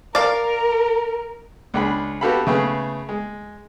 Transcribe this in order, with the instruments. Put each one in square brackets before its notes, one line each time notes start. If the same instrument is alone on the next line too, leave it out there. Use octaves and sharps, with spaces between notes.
[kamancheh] A#4 [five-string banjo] D5 F5
[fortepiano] C#2 D4 G#4 B5
B3 F#4 G4 A4 F5 B5
C#3 A3 B3 G#4
G#3